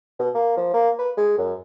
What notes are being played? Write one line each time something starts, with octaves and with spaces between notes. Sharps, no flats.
B2
A#3
F3
A#3
B4
G#3
F#2